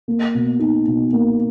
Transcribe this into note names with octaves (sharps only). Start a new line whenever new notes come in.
A#3
B2
D#4
B2
A#3